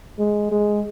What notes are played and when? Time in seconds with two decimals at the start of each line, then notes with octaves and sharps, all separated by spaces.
0.19 G#3
0.51 G#3